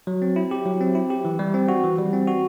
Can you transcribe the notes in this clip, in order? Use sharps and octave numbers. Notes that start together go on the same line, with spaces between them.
F#3
C4
E4
G4
F#3
C4
E4
G4
E3
G3
C4
F#4
E3
G3
C4
F#4